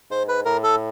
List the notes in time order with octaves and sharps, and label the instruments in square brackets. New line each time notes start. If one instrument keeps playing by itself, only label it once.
[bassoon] G#2 [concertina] C5
[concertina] B4
[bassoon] A2 [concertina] A#4
[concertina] A4